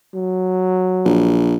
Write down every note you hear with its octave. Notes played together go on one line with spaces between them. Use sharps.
F#3
A#1